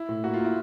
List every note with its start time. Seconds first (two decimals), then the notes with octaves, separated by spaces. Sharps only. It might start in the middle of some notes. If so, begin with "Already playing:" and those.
Already playing: E4
0.09 A2
0.24 A#3 F#4
0.34 F4
0.40 A#3 E4